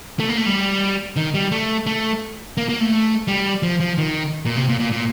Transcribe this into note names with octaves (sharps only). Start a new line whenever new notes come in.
A3
A#3
A3
G3
D#3
G3
A3
A3
A#3
A#3
A3
G3
F3
F3
D#3
A#2
C3
A#2
A#2
A#2